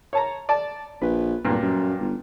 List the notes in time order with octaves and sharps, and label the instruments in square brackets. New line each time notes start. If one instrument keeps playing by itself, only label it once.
[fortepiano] C#5 A5 A#5
D5 A5
[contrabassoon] A#1 [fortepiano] B4
[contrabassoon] D1 [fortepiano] G2 A#2
[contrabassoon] F#2
G1